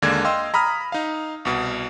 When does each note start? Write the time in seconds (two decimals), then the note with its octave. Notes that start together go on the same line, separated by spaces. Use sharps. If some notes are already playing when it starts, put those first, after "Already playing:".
0.02 D#2 D3 G#3 A#3 D4 G#6
0.25 D#5 F5 G5 C6 E6
0.54 A#5 B5 D#6 F6
0.92 D#4 F5
1.45 C2 B2